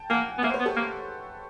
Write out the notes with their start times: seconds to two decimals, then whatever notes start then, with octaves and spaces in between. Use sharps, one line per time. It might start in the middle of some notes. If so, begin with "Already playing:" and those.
Already playing: G5 A5
0.10 A#3 F#5 G#5
0.38 B3
0.43 A#3 E5 F#5
0.49 C5
0.54 B4 C#5
0.60 B3
0.65 G4 A4
0.76 A#3